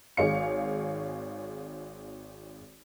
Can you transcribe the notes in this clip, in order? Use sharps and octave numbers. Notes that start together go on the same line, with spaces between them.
G#1 G#4 C#5 F5 C#7